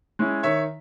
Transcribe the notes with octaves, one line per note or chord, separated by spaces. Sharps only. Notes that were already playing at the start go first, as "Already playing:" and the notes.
G#3 C#4 E4
D#3 C#5 E5